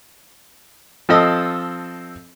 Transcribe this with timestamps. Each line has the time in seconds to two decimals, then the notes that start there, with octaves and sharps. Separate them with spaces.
1.09 F3 C4 A4 D#5